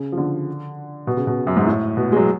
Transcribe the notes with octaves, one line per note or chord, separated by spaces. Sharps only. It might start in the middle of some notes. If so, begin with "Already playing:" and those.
Already playing: C#3
F3
D3
B2
C#3
B2
F#2
G#2
A2
B2
G#3
F#3